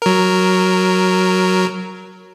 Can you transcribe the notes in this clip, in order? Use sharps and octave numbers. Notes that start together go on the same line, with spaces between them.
F#3 A#4